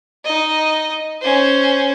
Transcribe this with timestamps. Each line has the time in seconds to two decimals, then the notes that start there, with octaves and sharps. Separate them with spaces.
0.25 D#4 D#5
1.21 C#4 C5